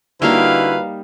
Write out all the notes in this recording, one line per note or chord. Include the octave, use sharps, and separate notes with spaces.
D3 G3 A#3 D#4 E4 F#4 B4 F5